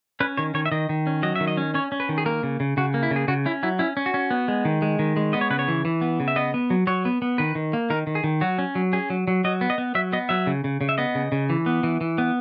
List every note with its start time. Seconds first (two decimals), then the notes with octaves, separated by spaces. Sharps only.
0.20 C#4 B4
0.37 D#3 C#5
0.54 D#3 C#5
0.66 E5
0.72 D#3 D#5
0.89 D#3
1.07 C#4
1.23 F#3 D#5
1.36 D#3 E5
1.48 D#5
1.57 C#4
1.74 C#4 C#5
1.92 C#4
2.00 B4
2.09 D#3
2.18 G#4
2.26 A#3 A#4
2.43 C#3
2.60 C#3
2.77 C#3 F#4
2.94 A#3
3.03 E4
3.11 C#3
3.16 G#4
3.28 C#3 F#4
3.46 C#4 E4
3.63 F#3 E4
3.79 C#4 E4
3.97 C#4
4.06 F#4
4.14 C#4
4.31 B3
4.48 G#3
4.65 D#3
4.82 G#3
4.99 D#3
5.17 G#3
5.33 B3 D#5
5.41 C#5
5.50 C#3 B4
5.59 C#5
5.68 E3
5.85 E3
6.01 B3
6.20 C#3
6.28 E5
6.36 B3 D#5
6.54 B3
6.70 F#3
6.87 F#3 C#5
7.05 B3
7.22 B3
7.38 D#3 B4
7.55 D#3
7.73 A#3
7.90 D#3 A#4
8.07 D#3
8.15 G#4
8.24 D#3
8.41 F#3 F#4
8.58 C#4
8.75 F#3
8.93 C#4 G#4
9.10 F#3
9.28 F#3
9.44 F#3 D#5
9.61 B3
9.70 D#5
9.78 B3
9.95 F#3 E5
10.12 B3 D#5
10.29 F#3 E5
10.47 C#3
10.64 C#3
10.81 C#3
10.89 E5
10.98 B3 D#5
11.15 C#3
11.32 C#3
11.50 E3
11.66 B3
11.83 E3
12.01 E3
12.18 B3